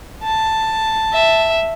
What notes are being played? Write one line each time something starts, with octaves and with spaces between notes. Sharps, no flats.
A5
E5